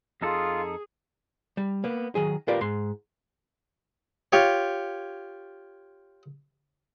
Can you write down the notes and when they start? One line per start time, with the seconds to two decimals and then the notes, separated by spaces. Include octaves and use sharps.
0.22 F2 D#4 F4 G#4 A4
1.57 G3
1.84 A#3 B3
2.15 D#3 F#3 G#4
2.48 F4 G4 A#4 B4 D5 F5
2.61 G#2 C6
4.32 F4 G4 C#5